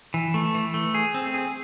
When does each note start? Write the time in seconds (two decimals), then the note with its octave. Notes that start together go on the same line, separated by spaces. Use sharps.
0.14 E3
0.34 A3
0.55 E3
0.74 A3
0.94 G#4
1.14 C4
1.34 G#4